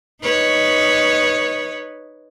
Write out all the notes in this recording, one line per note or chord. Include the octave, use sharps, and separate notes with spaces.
D#4 B4 C#5